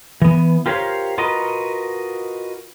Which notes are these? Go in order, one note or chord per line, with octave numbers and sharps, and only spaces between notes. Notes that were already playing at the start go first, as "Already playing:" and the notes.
E3 B3
F4 G4 A#4 C5 C#5 F5
F4 F#4 A#4 B4 D#5